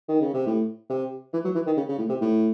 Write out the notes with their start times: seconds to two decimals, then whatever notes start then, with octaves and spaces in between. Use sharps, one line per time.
0.09 D#3
0.21 C#3
0.34 C3
0.47 A2
0.90 C3
1.34 E3
1.45 F#3
1.55 E3
1.67 D#3
1.77 C#3
1.89 C#3
1.99 A2
2.09 C3
2.21 A2